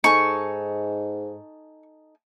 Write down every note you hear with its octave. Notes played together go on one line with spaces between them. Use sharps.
G#2 D#4 A4 G#5 C#6